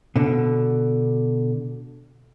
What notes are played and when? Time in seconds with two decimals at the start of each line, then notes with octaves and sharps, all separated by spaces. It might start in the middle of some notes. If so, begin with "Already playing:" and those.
0.16 B2 D3